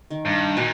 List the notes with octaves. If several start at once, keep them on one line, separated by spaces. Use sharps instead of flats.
D#3
G2
A#2 F#4